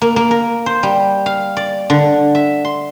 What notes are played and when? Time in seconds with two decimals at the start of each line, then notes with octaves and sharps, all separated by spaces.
0.01 A#3
0.16 A#3
0.31 A#4
0.66 C5
0.83 G3
1.26 F5
1.57 D5
1.90 D3
2.35 E5
2.65 C6